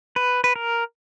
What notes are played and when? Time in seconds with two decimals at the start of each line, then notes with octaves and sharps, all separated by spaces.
0.16 B4
0.44 B4
0.56 A#4